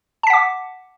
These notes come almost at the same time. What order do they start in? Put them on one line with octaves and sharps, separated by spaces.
A5 B6 F#5 D6